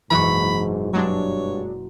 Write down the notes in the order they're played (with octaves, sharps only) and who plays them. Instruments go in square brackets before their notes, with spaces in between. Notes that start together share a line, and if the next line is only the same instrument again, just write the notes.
[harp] F#1 B2 C#6 [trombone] G#2 [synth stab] E3 [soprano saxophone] B5
[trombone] G2 [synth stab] F#3 G#3 D4 [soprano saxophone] C#5